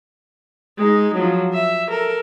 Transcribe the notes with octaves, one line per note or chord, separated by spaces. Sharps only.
G#3 D#4
F3 F#3
E5
A4 A#4